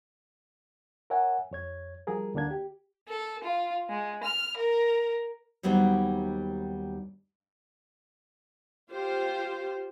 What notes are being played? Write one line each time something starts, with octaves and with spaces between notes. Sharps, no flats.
A#4 C#5 E5 F#5 G#5
F2 C#5 G#6
F3 G3 G#4 A#4
D2 D3 A#3 D4 G#6
G4
A4
F4
G#3
F6
A#4
D#2 F#3 G3 B3 D#4 C5
F4 G4 C5